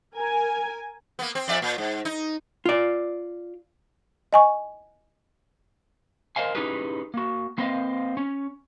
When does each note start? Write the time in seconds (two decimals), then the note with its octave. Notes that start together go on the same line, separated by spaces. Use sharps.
0.16 A#4 G#5
1.19 A#3 B3
1.35 C4
1.48 F2 D5 E5
1.62 A#2
1.78 G#2
2.05 D#4
2.65 F4 D5
4.33 D#5 G#5 C#6
6.36 A#4 C5 D#5 F5 G#5
6.55 C#4 D#4 E4 G4 G#4 B4
7.14 A#3 F#4
7.58 A#3 C4 B4 C5 D#5 F5
8.17 C#4